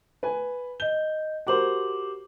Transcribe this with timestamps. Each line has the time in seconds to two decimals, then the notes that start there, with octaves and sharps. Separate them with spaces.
0.23 B4 G#5
0.80 D#5 G6 G7
1.47 F#4 G4 A#4 C5 D6 F#7